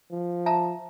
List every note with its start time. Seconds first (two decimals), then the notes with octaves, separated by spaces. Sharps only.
0.11 F3
0.46 E5 A5 A#5